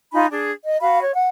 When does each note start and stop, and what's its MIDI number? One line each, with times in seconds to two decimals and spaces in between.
0.12 0.26 63
0.12 0.26 65
0.12 0.26 80
0.12 0.26 83
0.30 0.51 62
0.30 0.51 68
0.64 0.77 75
0.80 1.01 66
0.80 1.01 77
0.80 1.01 83
1.02 1.11 73
1.14 1.28 78